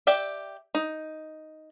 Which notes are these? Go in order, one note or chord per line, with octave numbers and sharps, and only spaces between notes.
G4 D5 E5 G5
D#4